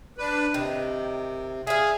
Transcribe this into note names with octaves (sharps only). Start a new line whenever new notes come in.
D4 B4
C3 D#3
G#4 E5 F5